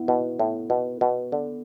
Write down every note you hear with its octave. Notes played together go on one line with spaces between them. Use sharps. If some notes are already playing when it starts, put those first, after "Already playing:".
Already playing: B3 E4
B2
A2
B2
B2
D3